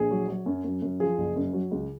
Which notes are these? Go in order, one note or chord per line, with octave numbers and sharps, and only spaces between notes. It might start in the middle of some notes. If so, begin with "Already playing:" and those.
Already playing: A#1 G#4
F#3
F#3
F#2
F#2
F#2
F3 G#4
F#1
F#2
F#3
C#2